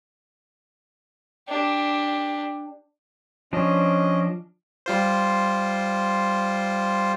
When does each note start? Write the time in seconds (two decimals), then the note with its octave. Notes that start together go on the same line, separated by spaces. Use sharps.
1.48 D4 G4
3.53 F3 C#4 D4 D#5
4.86 G3 F4 C5